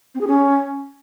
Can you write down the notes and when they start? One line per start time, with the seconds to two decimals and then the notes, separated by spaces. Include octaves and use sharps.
0.14 C4
0.21 G#4
0.27 C#4